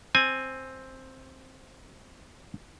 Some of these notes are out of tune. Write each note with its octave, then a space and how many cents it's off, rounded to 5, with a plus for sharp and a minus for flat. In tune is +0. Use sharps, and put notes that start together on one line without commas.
C4 +5 G#5 +0